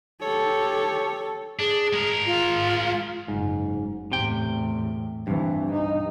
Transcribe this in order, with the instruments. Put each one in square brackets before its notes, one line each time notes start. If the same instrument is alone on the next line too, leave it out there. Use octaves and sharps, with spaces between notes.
[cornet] G4 [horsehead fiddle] A4 [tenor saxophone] C#5
[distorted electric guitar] D4 [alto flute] G#4
[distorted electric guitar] G#3 A#4
[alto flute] F4
[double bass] F#1 [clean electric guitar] G#2
[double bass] E2 A2 [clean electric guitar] C3 G5
[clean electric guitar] G2 [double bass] E3 C4
[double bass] D#4